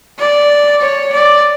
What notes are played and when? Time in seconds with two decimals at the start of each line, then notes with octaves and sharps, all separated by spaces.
0.19 D5
0.82 C#5
1.13 D5